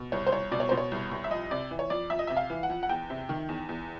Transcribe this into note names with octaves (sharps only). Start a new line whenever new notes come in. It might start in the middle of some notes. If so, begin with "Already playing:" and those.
Already playing: B2
C2 C#5
C5
C2 C#5
B2 D5
C#5
B2 C5
C#5
C2
C2
E5
F2 D#5
C3 D5
E3
C#5
F2 D5
F2 E5
D#5
C3 E5
F5
E3
F#5
F2
F#5
E2 G5
C3
D#3
E2
E2